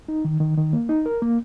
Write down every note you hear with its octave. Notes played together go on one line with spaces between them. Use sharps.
D#4
D#3
D#3
D#3
A#3
D#4
A#4
A#3